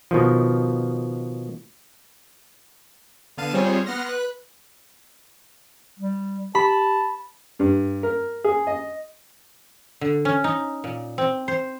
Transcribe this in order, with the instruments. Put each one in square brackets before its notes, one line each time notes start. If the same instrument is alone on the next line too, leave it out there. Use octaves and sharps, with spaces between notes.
[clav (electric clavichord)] B2 D#3 F3
[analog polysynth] D3 B3 F5 A5 D#7
G3 C4 F4 G#4 C5 C#5
B3 F#5 C6 F6 A#6
B4 F#6
[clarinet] G3
[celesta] G4 [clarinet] A5 [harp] B5
[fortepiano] G2
A#4
G#4
D#5
[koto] D3
C#4
D#4
A#2
C4
C5